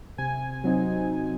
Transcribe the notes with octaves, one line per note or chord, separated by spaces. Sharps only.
C3 G#5
F#3 C4 D#4